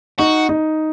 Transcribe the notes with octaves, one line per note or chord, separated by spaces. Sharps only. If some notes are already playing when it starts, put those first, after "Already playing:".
D#4 F#4
D#4